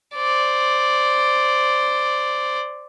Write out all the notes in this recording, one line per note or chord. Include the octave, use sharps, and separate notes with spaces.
C5 D5